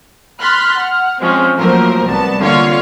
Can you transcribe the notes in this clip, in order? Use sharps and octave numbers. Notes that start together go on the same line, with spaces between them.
B5 C6 F6 F#6 A6 B6
F#5 F6
F3 G#3 C4 C#4 F4
F3 F#3 A3 A#3 A#4 C5
C2 B3 A5
D3 A#3 F4 C#5 F5